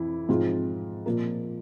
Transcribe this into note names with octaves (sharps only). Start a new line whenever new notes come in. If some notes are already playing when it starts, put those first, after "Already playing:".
Already playing: F2 E3 E4
G#2 F3 C4 F4 G#4
A#2 F3 A#3